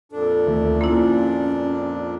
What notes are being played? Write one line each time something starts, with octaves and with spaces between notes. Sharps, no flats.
F2 A#2 D4 A4
D2 D#3 A3
A#3 C#4 E4 F4